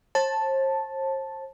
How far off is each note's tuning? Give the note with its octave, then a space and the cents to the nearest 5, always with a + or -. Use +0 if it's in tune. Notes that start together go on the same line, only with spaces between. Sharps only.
C5 +40 A5 +0